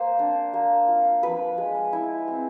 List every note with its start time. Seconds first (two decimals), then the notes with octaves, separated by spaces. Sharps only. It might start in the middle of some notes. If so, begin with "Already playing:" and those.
Already playing: A#3 C5
0.19 D4
0.54 A#3
0.88 F4
1.23 F3 B4
1.58 G#3
1.93 E4
2.28 C4